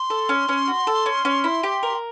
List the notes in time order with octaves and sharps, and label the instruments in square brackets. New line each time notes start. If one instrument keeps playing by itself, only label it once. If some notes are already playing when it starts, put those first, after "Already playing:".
Already playing: [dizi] C6
[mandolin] A4
C#4
C#4
F#4
A4
C#4
C#4
E4
G4
A#4